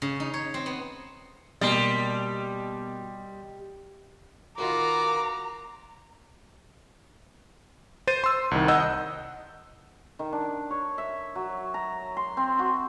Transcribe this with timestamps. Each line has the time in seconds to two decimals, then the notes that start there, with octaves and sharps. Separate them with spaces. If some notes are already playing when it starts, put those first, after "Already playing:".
0.02 C#3
0.20 D#4
0.34 C#5
0.54 C4
0.66 B3
1.61 B2 G3 A#3 D#5 C6 A6
4.58 D#3 F4 F#4 A#4 B4 A#5 D6
8.07 C5 A6 D#7
8.24 C6 E6
8.51 C2 D#3
8.68 D#5 F#5 E6 G6
10.19 D#3
10.33 D4
10.70 C#5
10.98 E5
11.35 F#3
11.74 A#5
12.17 C6
12.37 C4
12.59 F#4